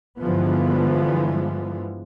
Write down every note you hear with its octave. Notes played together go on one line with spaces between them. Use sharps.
G2 D3 E3 F3 G#3 B3